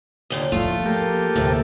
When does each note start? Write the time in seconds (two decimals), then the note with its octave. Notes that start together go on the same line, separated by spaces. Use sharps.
0.30 D#2 A#2 D3
0.52 E3 F3 A3 F4
0.86 A#3 G4 A4
1.36 D2 A2 C3